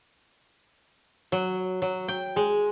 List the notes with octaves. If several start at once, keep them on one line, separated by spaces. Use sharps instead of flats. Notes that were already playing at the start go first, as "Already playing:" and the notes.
F#3
F#3
G5
G#3